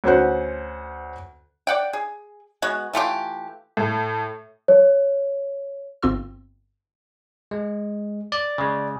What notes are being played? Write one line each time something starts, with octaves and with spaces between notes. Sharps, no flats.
D2 C#4 B4 C5 F#5
D5 F#5 G5
G#4
G#3 B3 F#4
E3 A3 F4 G4
A2
C#5
G1 C4 F4 C6 E6
G#3
D5
C#3 G#3